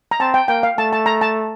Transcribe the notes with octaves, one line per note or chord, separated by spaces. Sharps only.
A#5
C4 A5
G5
A#3 G5
F5
A3 A5
A5
A#5
A5